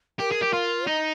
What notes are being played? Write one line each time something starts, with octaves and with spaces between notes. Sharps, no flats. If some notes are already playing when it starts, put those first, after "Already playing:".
G4 A#4
G#4
G4
F4
D#4 D#5